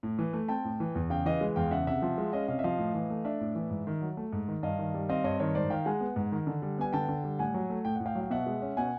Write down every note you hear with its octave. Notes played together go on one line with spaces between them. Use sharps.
A2
E3
A3
C4 G5 A5
A2
E3
E2
C#3 F5 G5
E3 D#5 F5
G#3
E2 F5 G5
C#3 E5 F#5
C3 E5 F#5
F3
G#3
C#4 D#5 F5
C3 D#5 F5
E5
F3 D#5 F5
A2
E3
A3
D4 D5 E5
A2
E3
G#2
D#3
F#3
A3
G#2
D#3
G2 D#5 F5
D#3
G3
C4 D#5 F5
G2 C#5 D#5
D#3 C#5 D#5
G#2 C5 D5
D#3 F5 G5
G#3 F#5 G#5
B3
G#2
D#3
D3
G3
B3 G#5
D3 G5 A5
D3
G3
A2 F#5 G#5
F#3
A3
A2 G5
A2 F#5
F5 G5
F#3
F5
B2 E5 F#5
G#3
C#4
B2 F#5 G#5